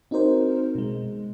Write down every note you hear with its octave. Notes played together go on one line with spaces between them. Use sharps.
C4 D#4 F#4 A#4 C5
B2 G#3